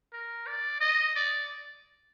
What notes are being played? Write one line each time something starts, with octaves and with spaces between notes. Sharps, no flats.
A#4
D5
D#5
D5